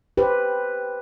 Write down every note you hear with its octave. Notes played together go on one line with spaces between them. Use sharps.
G4 B4 C5